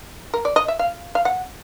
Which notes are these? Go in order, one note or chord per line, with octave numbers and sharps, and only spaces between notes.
A#4
D5
D#5
E5
F5
F5
F#5